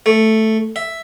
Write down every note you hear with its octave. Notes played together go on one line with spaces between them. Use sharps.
A3
E5